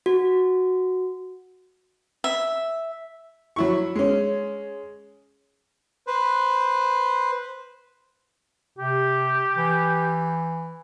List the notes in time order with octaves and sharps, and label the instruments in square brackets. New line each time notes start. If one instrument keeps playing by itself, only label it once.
[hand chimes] F#4
[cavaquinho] E5
[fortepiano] F#3 E4 C#6
G#3 C#4
[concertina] B4 C5
[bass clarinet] C3 [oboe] G4
[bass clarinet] E3